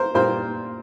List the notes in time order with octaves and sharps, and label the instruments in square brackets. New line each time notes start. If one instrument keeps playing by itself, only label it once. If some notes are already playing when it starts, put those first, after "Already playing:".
Already playing: [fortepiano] A#4 C5
A#2 G3 A#3 C5